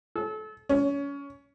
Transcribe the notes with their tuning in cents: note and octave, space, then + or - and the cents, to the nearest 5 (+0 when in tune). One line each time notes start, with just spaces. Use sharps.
A4 -30
C#4 +25